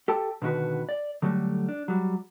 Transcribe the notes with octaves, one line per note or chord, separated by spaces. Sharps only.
G4 A4 G5 A5
B2 D3 D#3 F#4 B4
D5
D3 F#3 G3 A3
D4
F#3 G3